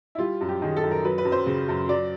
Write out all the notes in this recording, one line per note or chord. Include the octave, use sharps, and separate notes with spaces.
E4
G3 F4
F#2
G4
D#3 G#4
A4
F#2
A#4
F#3 B4
B4
F#2
C5
C#3
F#2
F#3 D5